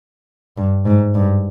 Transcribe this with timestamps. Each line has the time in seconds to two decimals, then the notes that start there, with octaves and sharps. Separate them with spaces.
0.57 G2
0.86 G#2
1.15 G2